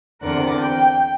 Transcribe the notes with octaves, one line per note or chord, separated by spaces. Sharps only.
E2 D3 C4 A#4 F#5 D6
G5